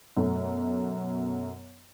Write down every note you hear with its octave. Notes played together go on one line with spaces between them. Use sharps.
F#2 B2 A3